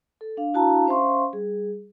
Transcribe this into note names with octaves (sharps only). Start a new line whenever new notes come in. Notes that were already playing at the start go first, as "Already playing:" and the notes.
A4
D4 F5
D4 E4 F#4 F5 A5 A#5
C#4 C5 E5 F5 C6 C#6
G3 G#4